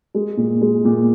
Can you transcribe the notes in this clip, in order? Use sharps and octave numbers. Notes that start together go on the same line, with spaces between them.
G#3
A#2
G#3
A#2